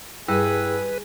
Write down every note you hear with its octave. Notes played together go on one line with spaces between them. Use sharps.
G2 E4 G#4 B4 G5 E6